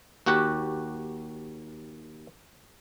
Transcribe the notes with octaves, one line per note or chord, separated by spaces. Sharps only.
D#2 F#4 G4 F#5